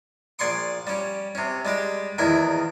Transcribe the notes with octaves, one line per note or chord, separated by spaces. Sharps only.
A#1 D5 G#5 C6 C#6 D#6
G3 C#4
C3 C#4
G3 G#3 G4
A#1 E2 D#3 E4 G#5